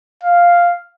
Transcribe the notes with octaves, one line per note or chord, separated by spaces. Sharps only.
F5